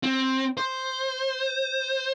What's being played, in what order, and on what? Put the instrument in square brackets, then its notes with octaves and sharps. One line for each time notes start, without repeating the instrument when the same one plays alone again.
[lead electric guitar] C4
C5